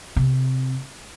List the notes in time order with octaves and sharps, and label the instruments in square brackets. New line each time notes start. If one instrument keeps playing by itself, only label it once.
[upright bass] C3